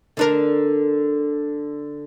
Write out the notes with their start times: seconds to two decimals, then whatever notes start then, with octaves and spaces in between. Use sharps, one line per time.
0.17 D3 D4 A#4